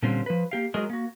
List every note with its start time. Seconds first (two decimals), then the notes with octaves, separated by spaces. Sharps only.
0.03 A#2 D3 G3 C4 C#4 F4
0.26 F3 B4
0.51 A#3 G4 F5
0.74 F#3 G#3 F#4 G#4 A#4 D#5
0.90 A#3 F#4